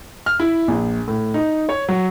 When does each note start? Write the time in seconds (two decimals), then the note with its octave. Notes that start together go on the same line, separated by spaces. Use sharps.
0.26 F6
0.40 E4
0.68 A#1
1.08 A2
1.34 D#4
1.69 C#5
1.88 F#3